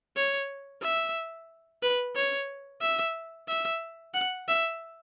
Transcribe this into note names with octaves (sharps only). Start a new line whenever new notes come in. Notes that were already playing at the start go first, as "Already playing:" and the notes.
C#5
E5
B4
C#5
E5
E5
F#5
E5